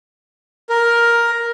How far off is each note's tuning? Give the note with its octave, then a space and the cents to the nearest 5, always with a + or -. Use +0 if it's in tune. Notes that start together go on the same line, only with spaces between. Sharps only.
A#4 +10